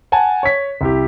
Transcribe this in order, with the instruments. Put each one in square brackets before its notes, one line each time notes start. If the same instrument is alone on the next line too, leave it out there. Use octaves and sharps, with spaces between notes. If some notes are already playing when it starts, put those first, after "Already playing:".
[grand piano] F#5 G#5 A5
C#5 B6
C2 E4 G4